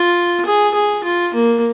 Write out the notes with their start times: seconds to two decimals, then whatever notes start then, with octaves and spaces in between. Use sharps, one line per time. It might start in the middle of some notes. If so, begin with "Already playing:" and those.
Already playing: F4
0.45 G#4
0.74 G#4
1.04 F4
1.34 A#3